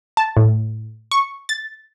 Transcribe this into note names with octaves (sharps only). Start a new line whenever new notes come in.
A5
A2
C#6
A6